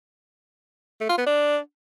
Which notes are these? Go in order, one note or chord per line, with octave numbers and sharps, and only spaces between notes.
A3
F4
B3
D4